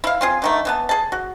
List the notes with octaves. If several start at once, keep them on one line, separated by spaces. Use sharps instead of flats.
E4 F5
C4 F4 G#4
D3 D#3 A3
E3 B3 A5
G#4 A5
F#4